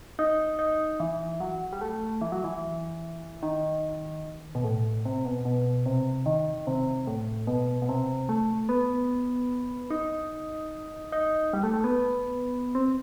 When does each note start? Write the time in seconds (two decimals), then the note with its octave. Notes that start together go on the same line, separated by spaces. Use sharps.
0.19 D#4
0.59 D#4
1.00 E3
1.40 F#3
1.73 G3
1.81 A3
2.21 E3
2.32 F#3
2.44 E3
3.43 D#3
4.55 B2
4.64 A2
5.05 C3
5.25 B2
5.45 B2
5.86 C3
6.26 D#3
6.67 C3
7.07 A2
7.47 B2
7.82 B2
7.89 C3
8.29 A3
8.69 B3
9.90 D#4
11.12 D#4
11.53 G3
11.63 A3
11.74 A3
11.84 B3
12.75 C4